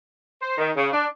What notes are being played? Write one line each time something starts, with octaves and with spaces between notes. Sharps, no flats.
C5
D#3
C#3
D4